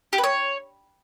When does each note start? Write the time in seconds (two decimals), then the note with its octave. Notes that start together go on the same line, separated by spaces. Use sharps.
0.13 G4
0.18 B4
0.24 C#5